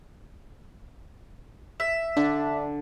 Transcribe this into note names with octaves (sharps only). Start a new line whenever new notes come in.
E5
D3 D4